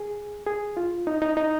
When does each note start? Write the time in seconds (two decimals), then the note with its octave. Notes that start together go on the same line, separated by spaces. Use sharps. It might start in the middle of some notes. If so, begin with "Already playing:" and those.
Already playing: G#4
0.46 G#4
0.77 F4
1.07 D#4
1.22 D#4
1.37 D#4